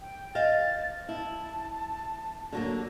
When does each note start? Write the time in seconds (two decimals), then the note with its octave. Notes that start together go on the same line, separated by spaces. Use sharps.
0.01 G5
0.35 C5 D#5 F5 A6
1.09 E4 A5
2.52 D3 F#3 A#3